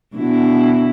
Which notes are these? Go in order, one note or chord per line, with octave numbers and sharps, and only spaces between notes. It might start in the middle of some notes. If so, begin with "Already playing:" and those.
B2 D3 E4